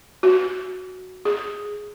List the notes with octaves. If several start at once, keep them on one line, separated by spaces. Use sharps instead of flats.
F#4
G#4